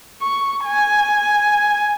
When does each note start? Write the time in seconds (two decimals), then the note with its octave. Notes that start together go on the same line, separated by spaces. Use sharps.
0.22 C#6
0.65 G#5